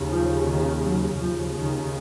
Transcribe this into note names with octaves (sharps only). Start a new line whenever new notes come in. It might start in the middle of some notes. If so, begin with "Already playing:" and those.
Already playing: D#2 C#3
F3
D#3
F#3
D#2 C#3 F3
D#3